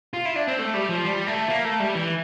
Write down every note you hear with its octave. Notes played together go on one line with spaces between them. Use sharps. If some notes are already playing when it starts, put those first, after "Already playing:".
F4
E4
D4
C4
A3
G3
F3
G3
A3
A#3
A3
G3
E3